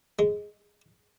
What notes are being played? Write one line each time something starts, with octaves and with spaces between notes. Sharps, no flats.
G#3